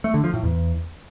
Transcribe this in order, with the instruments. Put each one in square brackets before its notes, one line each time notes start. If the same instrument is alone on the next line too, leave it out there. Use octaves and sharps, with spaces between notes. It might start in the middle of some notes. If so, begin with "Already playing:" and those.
[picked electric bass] A3
D3
F3
A2
E2